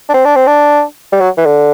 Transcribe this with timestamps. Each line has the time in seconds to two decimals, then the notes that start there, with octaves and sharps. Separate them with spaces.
0.09 D4
0.14 C4
0.25 D4
0.36 C4
0.47 D4
1.13 G3
1.21 F#3
1.37 E3
1.46 D3